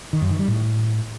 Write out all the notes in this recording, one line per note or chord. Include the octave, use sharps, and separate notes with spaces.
D#3
F#2
D#3
G3
A2